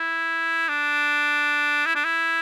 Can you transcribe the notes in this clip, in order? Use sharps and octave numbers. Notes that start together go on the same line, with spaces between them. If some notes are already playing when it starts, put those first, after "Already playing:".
Already playing: E4
D4
E4
D4
E4